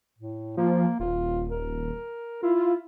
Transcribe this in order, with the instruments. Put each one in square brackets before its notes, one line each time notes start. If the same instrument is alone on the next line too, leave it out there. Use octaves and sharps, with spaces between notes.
[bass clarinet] A2
[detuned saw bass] F3 [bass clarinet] A#3
[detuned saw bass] D#1 [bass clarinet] F4
[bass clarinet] A#4
[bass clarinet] E4 [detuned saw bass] F4